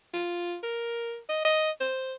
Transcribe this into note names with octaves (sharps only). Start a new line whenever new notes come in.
F4
A#4
D#5
D#5
C5